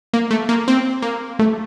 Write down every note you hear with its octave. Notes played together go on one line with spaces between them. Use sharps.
A#3
A3
A#3
C4
A#3
A3